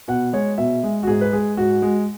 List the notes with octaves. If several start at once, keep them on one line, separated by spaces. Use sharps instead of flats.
B2 F#5
G#3 C#5
B2 E5
G#3
F#4
G#2 G#4
B4
G#3 G#4
G#2 F#4
G#3